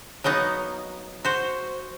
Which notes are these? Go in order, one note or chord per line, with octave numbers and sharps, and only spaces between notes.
F#3 A#3 B3 D#4
F#4 C5